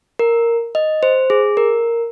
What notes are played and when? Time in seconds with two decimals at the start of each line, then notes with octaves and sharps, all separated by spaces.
0.19 A#4
0.75 D#5
1.03 C5
1.30 G#4
1.57 A#4